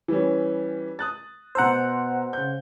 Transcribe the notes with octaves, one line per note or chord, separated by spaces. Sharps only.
E3 G3 C#4
D#6 F#6 A6
B2 C5 F#5 A#5 E6
C#3 G6